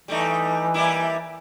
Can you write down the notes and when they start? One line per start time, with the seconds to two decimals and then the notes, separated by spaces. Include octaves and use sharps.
0.08 E3 G3 A3 D#4
0.74 G3 A#3 E4